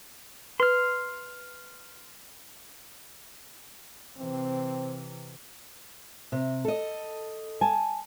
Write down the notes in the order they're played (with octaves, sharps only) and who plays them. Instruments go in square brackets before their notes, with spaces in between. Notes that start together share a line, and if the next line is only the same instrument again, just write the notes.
[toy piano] B4 [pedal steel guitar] C6 F6
[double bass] C3 E3 [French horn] C4
[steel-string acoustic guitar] C3
A4 D#5
[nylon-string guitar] G#5 A5